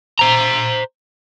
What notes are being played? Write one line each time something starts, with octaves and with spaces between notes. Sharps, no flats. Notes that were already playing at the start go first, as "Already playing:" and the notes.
C5 A#5